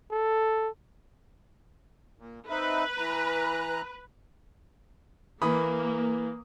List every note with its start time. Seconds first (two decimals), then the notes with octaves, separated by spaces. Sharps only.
0.12 A4
2.19 A#2
2.50 C4 D#4 B4 E5
2.97 E3 A#5 F#6
5.42 E3 A#3 B5 D#6